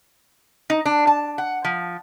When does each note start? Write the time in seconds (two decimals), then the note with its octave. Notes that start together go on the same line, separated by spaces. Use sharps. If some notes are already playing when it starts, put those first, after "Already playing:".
0.70 D#4
0.86 D4
1.07 A5
1.38 F#5
1.64 F3